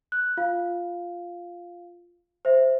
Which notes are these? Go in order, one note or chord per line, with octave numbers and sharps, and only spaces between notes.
F#6
F4 F5
C5 E5